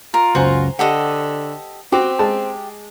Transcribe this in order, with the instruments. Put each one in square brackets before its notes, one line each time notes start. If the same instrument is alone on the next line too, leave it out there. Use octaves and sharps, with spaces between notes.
[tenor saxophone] F4 [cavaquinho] A#4
[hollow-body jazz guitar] C#2 F#2 C#3 [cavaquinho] F#4 [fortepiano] C5 G#5 A#5
[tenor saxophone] D3 [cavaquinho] G4 A4 D#5 [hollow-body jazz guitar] F#5
[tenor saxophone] C4 [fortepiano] F#4 G5 D6 [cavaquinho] G4
[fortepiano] G#3 A5